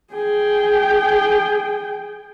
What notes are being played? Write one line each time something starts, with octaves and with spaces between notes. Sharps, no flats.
G#4 G5